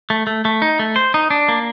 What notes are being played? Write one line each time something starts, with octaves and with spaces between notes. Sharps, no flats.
A3
A3
A3
D#4
A3
C5
D#4
D4
A#3